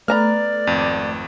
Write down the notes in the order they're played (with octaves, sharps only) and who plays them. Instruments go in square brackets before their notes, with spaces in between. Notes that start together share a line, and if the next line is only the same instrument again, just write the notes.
[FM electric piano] A3 [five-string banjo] B3 A#5 B5 [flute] D5 [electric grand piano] F6
[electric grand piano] G#1 F2